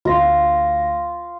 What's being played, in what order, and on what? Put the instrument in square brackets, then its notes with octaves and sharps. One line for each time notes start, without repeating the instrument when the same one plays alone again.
[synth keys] D2 A#6 [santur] F4